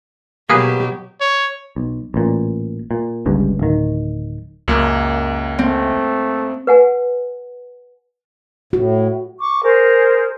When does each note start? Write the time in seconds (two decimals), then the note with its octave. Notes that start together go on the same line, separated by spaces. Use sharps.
0.50 B2 F#3 A#3 G4 G#4 B4 D#6
1.21 C#5
1.76 B1
2.14 A1 A#2
2.91 A#2
3.26 G1 C#2 G2
3.59 D1 D#3
4.68 C#2 F#2 A#3
5.59 A3 C4
6.67 B4 F#5 G#5
8.73 A2 F#4
9.39 C#6 D6
9.62 G#4 A#4 C5